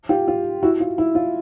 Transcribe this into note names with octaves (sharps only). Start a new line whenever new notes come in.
F4 G4
F4
E4 F#4
F4
E4
F4